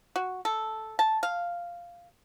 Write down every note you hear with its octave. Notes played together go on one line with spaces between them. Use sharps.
F#4
A4
A5
F5